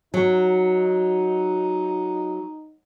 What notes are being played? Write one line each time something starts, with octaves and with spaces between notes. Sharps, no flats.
F#3 D#4